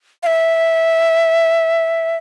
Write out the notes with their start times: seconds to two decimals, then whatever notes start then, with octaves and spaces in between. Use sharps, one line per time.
0.23 F5
0.27 E5